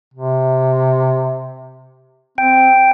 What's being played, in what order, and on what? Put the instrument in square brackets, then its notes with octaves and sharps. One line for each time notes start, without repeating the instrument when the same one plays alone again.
[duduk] C3
[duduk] C4 [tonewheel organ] G5